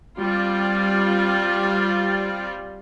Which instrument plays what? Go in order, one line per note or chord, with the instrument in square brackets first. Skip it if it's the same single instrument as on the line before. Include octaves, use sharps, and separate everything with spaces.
[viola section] G3 C4 F4 D5